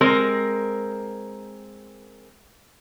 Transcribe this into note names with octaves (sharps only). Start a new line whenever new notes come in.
G#3 C4 A#4